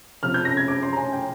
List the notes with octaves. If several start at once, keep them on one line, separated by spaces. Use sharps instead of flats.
C3 F3 F6
G6
A#6
G#6
D6
C6
A#5
G#5
G5